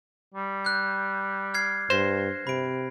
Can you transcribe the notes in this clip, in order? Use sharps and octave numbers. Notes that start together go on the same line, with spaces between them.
G3
F#6 G6
F6 G#6 C7
G2 C5 A#6 C7
C3 B5 D7